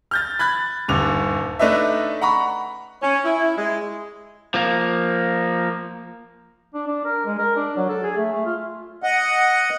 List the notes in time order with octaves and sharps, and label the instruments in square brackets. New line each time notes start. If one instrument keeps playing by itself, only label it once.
[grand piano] F6 G6 A6
B5 F#6 G#6 A6
D#1 G2 D3 F7
A3 D4 D#4 B4 D#5 E5
F#5 A#5 B5 C#6
[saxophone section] C#4
E4
G#3
[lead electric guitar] F3 A#3
[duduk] D4
D4
A#4
G#3
A#4
D4
F#3
A4
G#4
A3
A3
F4
[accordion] D#5 F#5